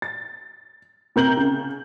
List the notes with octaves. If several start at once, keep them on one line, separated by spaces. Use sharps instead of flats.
A6
C3 A#4 G6 F#7
C#3